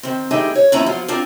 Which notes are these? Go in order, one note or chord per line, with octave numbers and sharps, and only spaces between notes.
D#3 C4
E3 A3 D#4 G4 G#4
C#5
D#2 F3 C#4 D#4 E4 A#5
F3 F#3 B3 F4
C4 D4 F4 A#4 G5